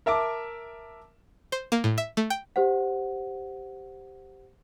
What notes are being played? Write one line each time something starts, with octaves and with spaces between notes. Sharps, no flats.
A#4 E5 A5 D6
C5
A#3
A2
E5
A3
G5
G4 C5 F#5